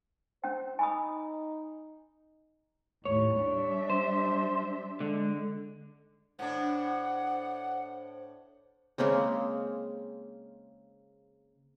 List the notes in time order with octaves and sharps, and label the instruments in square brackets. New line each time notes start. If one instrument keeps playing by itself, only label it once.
[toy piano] C#4 G5 [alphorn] C5
[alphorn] D#4 [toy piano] G#5 B5 D#6
[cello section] D#2 A2 [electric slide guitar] C#5
[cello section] G3 D4 E5
[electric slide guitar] C5
[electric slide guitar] D3 [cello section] G#3
[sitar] A2 D4 [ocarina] C5 [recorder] F#5
[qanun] C#3 G#3 A#3 C4